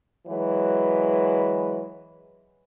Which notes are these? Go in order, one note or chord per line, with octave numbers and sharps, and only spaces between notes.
E3 F#3 G#3 B4